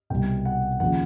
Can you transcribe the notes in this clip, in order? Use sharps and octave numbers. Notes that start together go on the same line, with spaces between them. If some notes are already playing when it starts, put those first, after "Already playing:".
C2 B2 G3 G5
F#5
D#2 C#3 F3 F#5